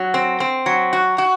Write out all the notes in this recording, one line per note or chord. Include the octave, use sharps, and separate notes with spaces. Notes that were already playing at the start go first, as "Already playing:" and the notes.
Already playing: F#3
C4
C4
F#3
F#4
F#4